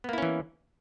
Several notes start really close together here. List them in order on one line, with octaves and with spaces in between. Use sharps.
B3 A#3 E4 C#4 E3